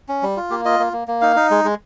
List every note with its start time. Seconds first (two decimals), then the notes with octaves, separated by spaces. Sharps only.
0.09 C#4
0.23 G3
0.37 F4
0.50 A#3 G4
0.65 F4 D#5
0.79 A#3
0.93 A#3
1.08 A#3
1.21 D#4 F5
1.36 D#4
1.51 G#3
1.64 G#3